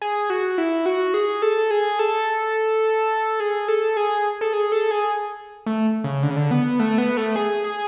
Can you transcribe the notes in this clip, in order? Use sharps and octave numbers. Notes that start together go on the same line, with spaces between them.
G#4
F#4
E4
F#4
G#4
A4
G#4
A4
G#4
A4
G#4
A4
G#4
A4
G#4
A3
C#3
D3
C#3
D3
B3
A3
B3
A3
G#4
G#4